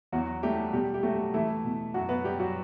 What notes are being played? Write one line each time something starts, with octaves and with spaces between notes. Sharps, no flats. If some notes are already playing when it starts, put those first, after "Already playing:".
E2 F#3 F#4
G3 A3 G4
B2 G3 G4
G4
F#3 A3 F#4
E3 A3 E4
B2
F#2 F#3 F#4
B3 B4
G3 G4
F#3 F#4